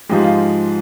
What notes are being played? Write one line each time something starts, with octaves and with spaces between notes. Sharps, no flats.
G#2 F3 G#3 G4
F4